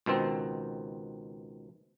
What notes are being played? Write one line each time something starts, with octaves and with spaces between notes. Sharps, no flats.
C#2 B2 D#3 C4